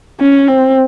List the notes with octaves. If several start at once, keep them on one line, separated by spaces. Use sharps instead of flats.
C#4
C4